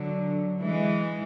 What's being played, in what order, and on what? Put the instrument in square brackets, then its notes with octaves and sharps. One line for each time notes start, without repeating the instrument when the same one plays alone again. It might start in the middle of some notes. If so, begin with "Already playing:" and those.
Already playing: [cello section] D3 F#3
E3 G#3